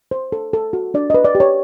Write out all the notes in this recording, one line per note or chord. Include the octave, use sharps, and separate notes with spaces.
C5
A4
A4
F#4
D4 D5
B4 D#5
D5
G4
C#5